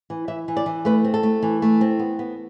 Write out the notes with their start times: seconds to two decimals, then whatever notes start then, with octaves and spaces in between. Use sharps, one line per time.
0.10 E3
0.28 E3 E5
0.48 E3
0.57 D5
0.66 E3
0.85 A3 B4
1.04 C4
1.14 A4
1.23 A3
1.42 E3
1.62 A3
1.81 C4
1.99 B3
2.19 B3